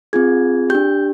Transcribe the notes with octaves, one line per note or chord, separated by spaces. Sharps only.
C4 F4 G#4 G#6
D4 G4 G6